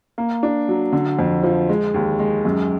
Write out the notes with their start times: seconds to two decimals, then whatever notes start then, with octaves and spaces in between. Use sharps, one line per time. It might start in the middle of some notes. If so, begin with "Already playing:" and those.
0.18 A#3
0.43 D4
0.68 F#3
0.92 D3
1.19 F2
1.43 F3
1.69 G#3
1.94 D#2
2.19 G#3
2.45 F#2